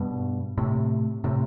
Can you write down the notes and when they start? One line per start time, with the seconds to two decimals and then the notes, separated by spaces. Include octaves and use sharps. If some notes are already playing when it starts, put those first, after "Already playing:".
Already playing: G2 B2
0.58 A2 C3
1.24 A2 C3